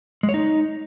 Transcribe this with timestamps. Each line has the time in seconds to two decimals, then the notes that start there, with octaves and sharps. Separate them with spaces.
0.23 G#3
0.29 C#5
0.34 D#4